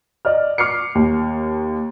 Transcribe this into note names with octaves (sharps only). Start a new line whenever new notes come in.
D5 D#5 F6
D6 F6 C7 C#7
D#2